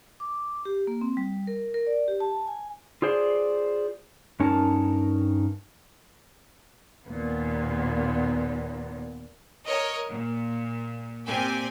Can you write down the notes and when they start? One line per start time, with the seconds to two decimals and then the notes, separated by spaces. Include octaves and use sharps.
0.20 D6
0.65 G4
0.87 A#3
1.01 C4
1.17 G3
1.47 A#4
1.74 A#4
1.87 D5
2.08 G4
2.20 A5
2.47 G#5
3.02 F4 G#4 C5 D5
4.40 G2 C#4 D#4 A#4 A5
7.07 D#2 A#2 B3
9.66 A#4 C#5 D#5
10.09 A#2
11.27 A#2 C4 G4 G#5